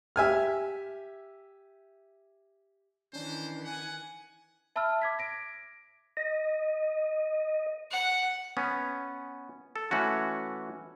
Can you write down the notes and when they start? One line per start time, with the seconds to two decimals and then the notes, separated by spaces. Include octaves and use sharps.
0.16 G4 E5 G#5 F6
3.13 D#3 E3 C#4 D4 C5
3.65 F#5 G#5
4.76 E5 A5 B5 E6 F6
5.02 D6 G#6 B6
5.19 A#6 D7
6.17 D#5
7.91 F#5
8.57 B3 C#4
9.76 A4
9.91 E3 A3 C#4 F#4